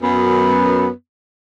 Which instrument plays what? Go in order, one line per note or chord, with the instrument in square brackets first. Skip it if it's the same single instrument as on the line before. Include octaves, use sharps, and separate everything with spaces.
[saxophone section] F#2 B3